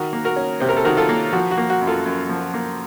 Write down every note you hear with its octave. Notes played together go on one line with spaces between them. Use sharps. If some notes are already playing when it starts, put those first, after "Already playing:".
Already playing: D#3 F#4 A#4
A#3
F#4 A#4
C#4
C3 C5
A#4
A4
D#3 F#4 A#4
F4 A4
A#3
F3 F#4
F#4
A#3
F#4
F#2
F4 A4
F#2
F3
A#3